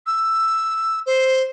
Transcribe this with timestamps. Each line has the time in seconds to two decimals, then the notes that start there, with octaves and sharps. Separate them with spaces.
0.06 E6
1.06 C5